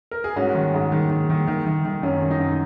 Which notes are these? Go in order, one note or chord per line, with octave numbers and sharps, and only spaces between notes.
A#4
G#4
G#2 C#4 F#4
D#3
G#2
D#3
D#3
D#3
D#3
D#3
D#3
F#2 C#4
D#3
D#4
F#2